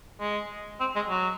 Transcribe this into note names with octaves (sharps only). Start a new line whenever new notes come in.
G#3
C4
G#3
F#3